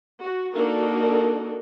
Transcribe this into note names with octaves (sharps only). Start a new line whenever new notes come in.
F#4
A#3 D4 D#4 F#4 A4 A#4